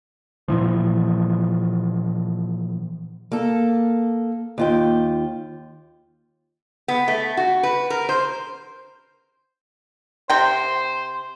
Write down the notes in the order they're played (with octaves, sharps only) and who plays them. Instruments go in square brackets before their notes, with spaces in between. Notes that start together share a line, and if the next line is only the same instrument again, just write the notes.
[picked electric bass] A#2 E3 F3
[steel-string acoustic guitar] A#3 A4
D#2 F4 G5
[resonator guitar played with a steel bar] B3
A3
F#4
B4
A#4
C5
[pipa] C3 G5 [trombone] C5